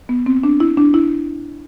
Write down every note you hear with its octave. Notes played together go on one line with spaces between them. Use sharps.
B3
C4
D4
E4
D4
E4